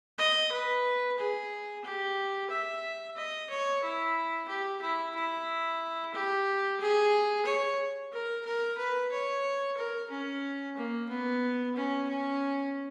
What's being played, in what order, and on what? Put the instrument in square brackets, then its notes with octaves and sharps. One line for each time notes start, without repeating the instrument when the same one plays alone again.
[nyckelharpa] D#5
B4
G#4
G4
E5
D#5
C#5
E4
G4
E4
E4
G4
G#4
C#5
A#4
A#4
B4
C#5
A#4
C#4
A#3
B3
C#4
C#4